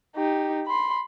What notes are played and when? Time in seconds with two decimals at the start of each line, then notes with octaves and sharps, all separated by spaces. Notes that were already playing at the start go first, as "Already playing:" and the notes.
0.16 D#4 G4
0.67 B5 C6